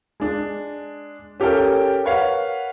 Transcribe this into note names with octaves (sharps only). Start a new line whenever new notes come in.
G#3 D4
C#4 G4 A4 A#4 G5
A#4 B4 C#5 F5 F#5